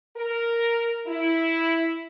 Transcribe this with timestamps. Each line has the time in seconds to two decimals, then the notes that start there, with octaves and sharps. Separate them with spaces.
0.16 A#4
1.07 E4